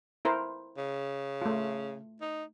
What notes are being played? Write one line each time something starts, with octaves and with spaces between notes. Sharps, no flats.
E4 A#4 C5
C#3
A3 F4
D#4